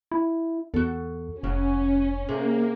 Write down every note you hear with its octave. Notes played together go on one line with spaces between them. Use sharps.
E4
E2 F#4 A4
F1 C#3 F#3 C#4
C3 A#3 G#4